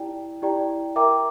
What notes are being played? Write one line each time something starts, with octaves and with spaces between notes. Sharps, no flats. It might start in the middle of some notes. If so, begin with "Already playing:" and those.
Already playing: E4 G4 D5 G5 A#5
E4 G4 D5 G5 A#5
A#4 E5 G5 A#5 D6